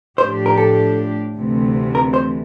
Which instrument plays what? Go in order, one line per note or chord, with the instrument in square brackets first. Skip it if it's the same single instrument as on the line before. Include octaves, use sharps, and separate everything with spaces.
[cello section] A2 F3 A3 D4 G4 [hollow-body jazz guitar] C5
[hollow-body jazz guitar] A#4
A4
[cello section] D2 C3 E3 A3
[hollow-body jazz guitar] A#4
C5